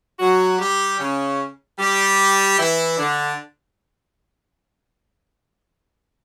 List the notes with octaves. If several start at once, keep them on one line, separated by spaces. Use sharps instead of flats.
F#3 F#4
G3 G4
C#3 C#4
G3 G4
E3 E4
D3 D4